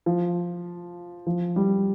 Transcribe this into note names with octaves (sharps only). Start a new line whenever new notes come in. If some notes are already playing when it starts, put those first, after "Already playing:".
F3
F3
G3